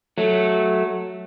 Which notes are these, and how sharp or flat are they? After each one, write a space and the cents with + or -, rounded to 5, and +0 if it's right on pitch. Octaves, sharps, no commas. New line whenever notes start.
F#3 +0 A3 -10